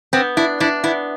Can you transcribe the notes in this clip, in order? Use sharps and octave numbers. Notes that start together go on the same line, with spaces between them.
B3 C4
D4 E4
D4 E4
B3 E4